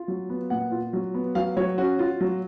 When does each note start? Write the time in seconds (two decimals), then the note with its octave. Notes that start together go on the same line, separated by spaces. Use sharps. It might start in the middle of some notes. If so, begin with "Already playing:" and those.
Already playing: F4
0.08 F#3
0.30 B3
0.50 A#2 F#5
0.72 F4
0.93 F#3
1.14 B3
1.35 F#3 F5
1.57 F#3 C#5
1.78 C#4 F#4
1.99 F4
2.21 F#3